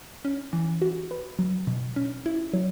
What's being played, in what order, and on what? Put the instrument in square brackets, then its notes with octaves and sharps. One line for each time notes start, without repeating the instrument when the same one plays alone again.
[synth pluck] C#4
E3
F#4
B4
F#3
B2
C#4
E4
F#3